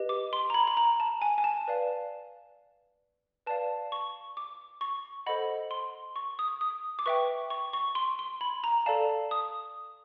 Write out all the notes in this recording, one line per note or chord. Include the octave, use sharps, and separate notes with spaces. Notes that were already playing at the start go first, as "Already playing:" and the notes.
Already playing: G4 B4 D#5
D6
C6
A#5
B5
B5
A#5
A5
G#5
G#5
A5
B4 D5 F5
B4 D5 F5 A5
C#6
D6
C#6
A4 C5 D#5 F#5 B5
C6
C#6
D#6
D#6
D6
B4 E5 G5 C#6
C#6
C#6
C6
C6
B5
A#5
A4 D5 F5 A5
D#6